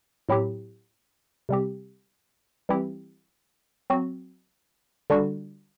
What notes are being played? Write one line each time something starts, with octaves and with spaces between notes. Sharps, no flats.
A2 F#3 C4 E4 G4
C3 G3 C4 G4
E3 G3 C4 E4 G4
F#3 C4 F#4
D3 G3 D4 F#4